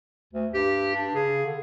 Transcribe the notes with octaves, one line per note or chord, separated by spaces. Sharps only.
D2
G2 G4
D4
C#3 G#4
D3